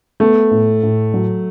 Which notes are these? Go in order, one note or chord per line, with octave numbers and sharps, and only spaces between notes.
A3 B3
A2
A2
F#3